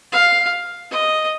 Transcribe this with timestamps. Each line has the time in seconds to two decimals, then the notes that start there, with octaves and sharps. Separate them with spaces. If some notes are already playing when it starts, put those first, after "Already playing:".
0.12 F5
0.91 D#5